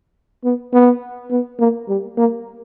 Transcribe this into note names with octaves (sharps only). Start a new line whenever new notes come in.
B3
B3
B3
A#3
G3
A#3